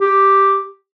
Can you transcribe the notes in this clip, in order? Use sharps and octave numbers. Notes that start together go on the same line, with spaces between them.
G4